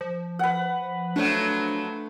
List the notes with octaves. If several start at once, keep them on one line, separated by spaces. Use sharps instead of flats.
F3
B4 F#5
F3 F#3 A3 D4